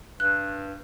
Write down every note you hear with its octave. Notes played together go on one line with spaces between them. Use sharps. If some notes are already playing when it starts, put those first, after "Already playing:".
G2 F#6